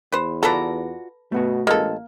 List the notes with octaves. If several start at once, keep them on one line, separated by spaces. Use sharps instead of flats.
E2 B4 C5
F4 F#4 A4 B4 D5 A5 A#5
B2 A3 B3 F#4
A1 G#3 A#3 A4